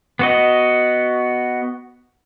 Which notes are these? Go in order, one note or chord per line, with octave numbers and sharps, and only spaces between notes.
B3 F#4 D#5